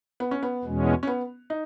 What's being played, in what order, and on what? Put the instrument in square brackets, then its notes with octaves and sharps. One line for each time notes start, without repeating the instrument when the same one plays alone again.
[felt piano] B3
C#4
B3
[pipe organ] E2 B2 G#3 C#4
[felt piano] C#4
B3
D#4